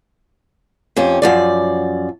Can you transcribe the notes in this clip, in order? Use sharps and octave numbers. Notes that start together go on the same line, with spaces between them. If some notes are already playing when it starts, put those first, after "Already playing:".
F2 C#4 G4
F#2 F3 D5